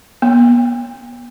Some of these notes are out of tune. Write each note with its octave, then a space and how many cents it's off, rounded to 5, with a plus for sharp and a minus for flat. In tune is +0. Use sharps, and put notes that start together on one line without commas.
B3 -40